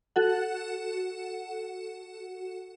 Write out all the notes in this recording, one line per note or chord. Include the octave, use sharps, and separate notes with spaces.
F#4 A4 F#5